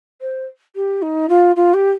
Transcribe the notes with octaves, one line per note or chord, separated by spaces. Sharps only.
C5
G4
D#4
F4
F4
G4